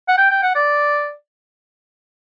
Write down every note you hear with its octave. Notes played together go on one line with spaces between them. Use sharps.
F#5
G5
G5
F#5
D5